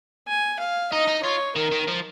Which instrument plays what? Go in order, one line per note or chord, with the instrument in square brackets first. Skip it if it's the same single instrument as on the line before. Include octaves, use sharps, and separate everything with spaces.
[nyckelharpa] G#5
F5
[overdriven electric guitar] D#4 [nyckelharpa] D#5
[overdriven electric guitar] D#4
[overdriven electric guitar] F4 [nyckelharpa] C#5
[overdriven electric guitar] D#3 [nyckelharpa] A#4
[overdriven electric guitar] D#3
F3